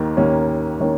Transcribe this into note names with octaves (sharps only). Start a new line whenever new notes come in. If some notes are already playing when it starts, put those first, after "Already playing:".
Already playing: D#2 D#3 A#3
D#2 D#3 A#3 C#4
D#3 A#3 C#4